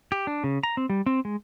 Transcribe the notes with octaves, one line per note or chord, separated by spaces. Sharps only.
G4
D4
C#3
A#5
C4
G3
C4
G#3